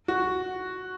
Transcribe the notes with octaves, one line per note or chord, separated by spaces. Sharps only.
F#4